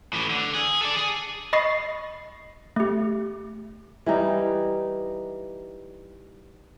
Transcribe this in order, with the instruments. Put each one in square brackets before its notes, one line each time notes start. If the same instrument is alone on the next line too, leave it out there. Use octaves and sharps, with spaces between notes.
[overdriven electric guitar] A2 E3
D3
G#4
A4 D5
G#4
[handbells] D#5 B5 C#6 D#6 A6 C7
A3 G4
[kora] E3 G3 D#4